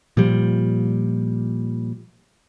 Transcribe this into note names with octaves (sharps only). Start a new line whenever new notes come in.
A#2 F3 G3